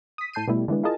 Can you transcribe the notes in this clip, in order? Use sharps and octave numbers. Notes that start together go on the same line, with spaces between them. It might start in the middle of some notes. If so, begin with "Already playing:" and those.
D#6 B6
A2 A5 G6 C7 D#7
B2 G3 A3 E4
D3 E3 G#3 B3
E4 F4 G#4 A#4 D#5 A5